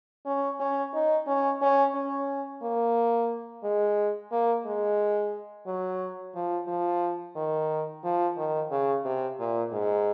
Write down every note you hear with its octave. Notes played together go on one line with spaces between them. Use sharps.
C#4
C#4
D#4
C#4
C#4
C#4
A#3
G#3
A#3
G#3
F#3
F3
F3
D#3
F3
D#3
C#3
C3
A#2
G#2